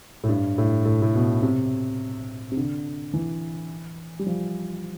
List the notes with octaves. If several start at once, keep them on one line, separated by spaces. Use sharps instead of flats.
A2
G2
A2
A2
A2
B2
C3
C3
D3
E3
G3
F3